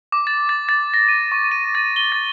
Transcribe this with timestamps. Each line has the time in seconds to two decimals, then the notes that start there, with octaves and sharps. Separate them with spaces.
0.12 D6
0.27 A6
0.49 A6
0.69 A6
0.94 A#6
1.08 D#7
1.32 C#6
1.51 D#7
1.75 A6
1.96 G7
2.12 A6